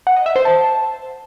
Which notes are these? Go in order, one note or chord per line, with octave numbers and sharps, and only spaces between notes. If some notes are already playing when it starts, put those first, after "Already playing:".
F#5
D#5
E5
C5
A5